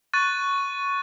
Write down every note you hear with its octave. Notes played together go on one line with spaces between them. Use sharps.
C#6 F#6 A6 D#7